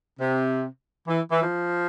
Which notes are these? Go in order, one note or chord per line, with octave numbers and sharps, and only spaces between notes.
C3
E3
E3
F3